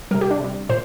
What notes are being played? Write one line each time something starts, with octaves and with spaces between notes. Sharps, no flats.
C3 G3 A#4
G4
D4
C3 G3
A#2 C5